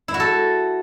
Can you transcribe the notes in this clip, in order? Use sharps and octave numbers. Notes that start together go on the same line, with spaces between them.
E4
F#4
A4